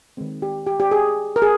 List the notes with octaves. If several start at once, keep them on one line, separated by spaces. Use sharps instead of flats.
D#3 G#3 C4
G4
G4
G4
G#4
A#4
G#4